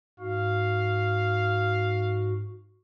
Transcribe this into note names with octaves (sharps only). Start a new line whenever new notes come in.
G#2 F#4 F5